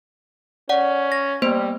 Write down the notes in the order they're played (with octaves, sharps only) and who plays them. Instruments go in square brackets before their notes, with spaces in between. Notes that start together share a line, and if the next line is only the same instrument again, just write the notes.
[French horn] C#4 [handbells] D5 F#5
[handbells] A#6
[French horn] G3 [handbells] A#3 B3 C5